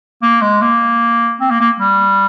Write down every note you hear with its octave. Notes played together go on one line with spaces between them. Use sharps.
A#3
G#3
A#3
C4
A#3
A#3
G3